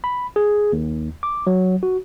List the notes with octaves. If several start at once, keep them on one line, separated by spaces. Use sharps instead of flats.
B5
G#4
D#2
D6
F#3
F#4